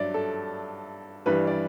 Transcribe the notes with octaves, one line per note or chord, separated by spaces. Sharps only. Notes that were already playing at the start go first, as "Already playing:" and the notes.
Already playing: G2 F#3 D5 E5
A4
G2 E3 G3 B4
D5